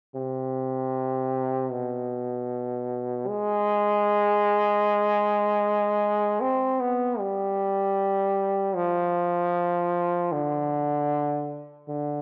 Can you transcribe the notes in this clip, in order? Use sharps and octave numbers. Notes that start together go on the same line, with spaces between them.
C3
B2
G#3
C4
B3
G3
F3
D3
D3